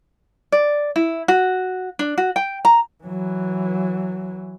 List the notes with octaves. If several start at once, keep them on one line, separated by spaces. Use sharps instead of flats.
D5
E4
F#4
D4
F#4
G5
A#5
E3 F#3